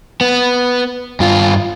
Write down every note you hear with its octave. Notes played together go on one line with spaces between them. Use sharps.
B3
G2 F4